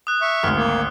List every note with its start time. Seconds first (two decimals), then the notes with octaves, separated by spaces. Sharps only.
0.07 D#6 F#6
0.21 E5 C#6
0.43 G#1 D2 F6
0.56 A#3